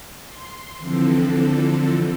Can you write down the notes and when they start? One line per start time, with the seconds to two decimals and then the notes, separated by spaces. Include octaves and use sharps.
0.24 C6
0.78 D3 E3 F3 C4 A4